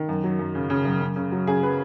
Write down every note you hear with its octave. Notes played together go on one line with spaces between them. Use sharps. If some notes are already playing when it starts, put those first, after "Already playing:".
Already playing: D#3
F#2
F#3
F#2
C#3
C#3
F#2
F#2
C#3
F#3
C#3 G#4
F#3 B4